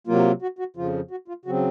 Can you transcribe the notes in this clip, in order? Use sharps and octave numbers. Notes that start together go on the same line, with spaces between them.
C3 F#3 A#3 F4
F#4
F#4
F2 C#3 F3 F4
F#4
F4
C#3 F#3 C4 F#4